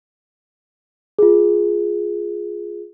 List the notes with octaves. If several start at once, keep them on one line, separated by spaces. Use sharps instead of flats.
F4 G#4